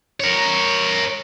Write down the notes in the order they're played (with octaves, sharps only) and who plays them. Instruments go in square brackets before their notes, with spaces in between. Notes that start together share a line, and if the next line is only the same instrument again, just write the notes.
[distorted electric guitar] A#4 C#5